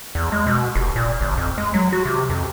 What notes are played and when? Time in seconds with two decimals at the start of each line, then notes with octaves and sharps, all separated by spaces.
0.15 E2
0.32 G#3
0.47 B2
0.75 F1
0.96 A#2
1.21 G1
1.38 F2
1.58 G#3
1.74 F#3
1.92 F#4
2.05 C3
2.30 F2